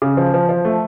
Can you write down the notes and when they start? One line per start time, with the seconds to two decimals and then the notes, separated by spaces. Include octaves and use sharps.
0.02 C#3
0.17 F3
0.34 F3
0.49 F3
0.65 A3